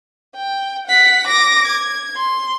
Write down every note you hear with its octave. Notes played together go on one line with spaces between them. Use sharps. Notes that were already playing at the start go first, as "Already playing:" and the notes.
G5
F#5 B6
D6 A#6
G#6
C6